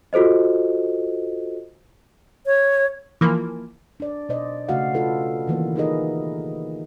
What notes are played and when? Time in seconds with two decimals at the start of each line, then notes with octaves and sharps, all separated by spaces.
0.13 F4 F#4 A4 C5 D#5
2.46 C#5
3.21 E3 F3 A#3
4.00 D4 D5
4.29 B2 D4 C5 D5 D#5
4.68 C#3 A3 D4 F#4 F5 F#5
4.94 F4 F#4 A4 B4
5.48 D#3 E3 A#3 B3
5.76 D#4 G4 G#4 A#4 B4 D#5